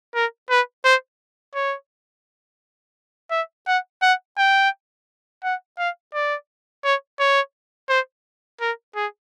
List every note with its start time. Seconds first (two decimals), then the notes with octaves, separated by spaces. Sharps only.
0.15 A#4
0.50 B4
0.85 C5
1.55 C#5
3.31 E5
3.67 F#5
4.02 F#5
4.37 G5
5.44 F#5
5.79 F5
6.14 D5
6.84 C#5
7.20 C#5
7.89 C5
8.61 A#4
8.96 G#4